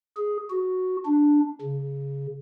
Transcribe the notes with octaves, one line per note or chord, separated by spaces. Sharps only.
G#4
F#4
D4
C#3